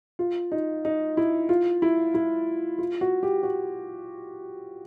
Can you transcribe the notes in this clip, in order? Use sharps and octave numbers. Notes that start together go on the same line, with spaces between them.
F4
D#4
D#4
E4
F4
E4
E4
F4
F#4
G4
F#4